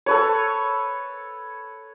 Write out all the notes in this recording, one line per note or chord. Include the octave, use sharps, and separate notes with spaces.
A4 B4 C#5